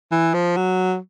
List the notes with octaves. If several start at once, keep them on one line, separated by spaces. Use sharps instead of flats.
E3
F3
F#3